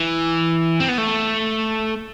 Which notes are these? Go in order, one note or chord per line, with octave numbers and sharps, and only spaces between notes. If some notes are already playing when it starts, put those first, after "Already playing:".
Already playing: E3
C4
B3
A3